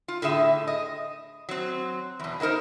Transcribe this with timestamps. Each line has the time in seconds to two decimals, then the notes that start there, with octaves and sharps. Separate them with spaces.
0.08 F4
0.22 A2 D3 G#4 E5
0.67 D#5
1.49 F#3 C4
2.20 E2 B2
2.40 F#3 A#3 D#4 A#4 C5